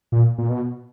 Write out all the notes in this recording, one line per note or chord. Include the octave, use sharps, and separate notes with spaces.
A#2
A#2
B2